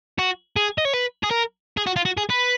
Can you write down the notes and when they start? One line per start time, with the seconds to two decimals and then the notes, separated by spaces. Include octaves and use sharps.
0.19 F#4
0.56 G#4
0.78 D#5
0.85 C#5
0.94 B4
1.23 G#4
1.30 A#4
1.77 G#4
1.86 F#4
1.96 F4
2.05 F#4
2.18 G#4
2.30 B4